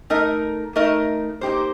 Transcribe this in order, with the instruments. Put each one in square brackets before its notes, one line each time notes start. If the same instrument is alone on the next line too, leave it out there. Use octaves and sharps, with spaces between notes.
[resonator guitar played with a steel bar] A3 D#4 A#4 D#5
A3 D#4 A#4 D#5
A#3 D#4 G4 C5